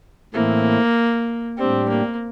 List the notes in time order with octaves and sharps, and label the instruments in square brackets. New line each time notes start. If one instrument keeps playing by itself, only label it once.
[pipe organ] A2 E3 A3 C4 E4 [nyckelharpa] A#3
[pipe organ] A2 G3 D4 G4 [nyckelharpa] C4
[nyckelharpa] A#3